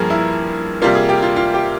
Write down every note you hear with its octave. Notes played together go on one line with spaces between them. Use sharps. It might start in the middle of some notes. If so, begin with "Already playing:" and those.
Already playing: G2 F3 A#3 G#4 A#4
E4
C3 G3 A#3 F4
G#4
G4
F4
F4
G4